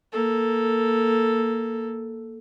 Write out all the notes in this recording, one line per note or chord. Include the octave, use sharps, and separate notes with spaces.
A#3 A4